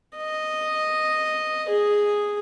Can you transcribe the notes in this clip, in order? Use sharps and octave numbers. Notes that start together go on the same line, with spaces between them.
D#5
G#4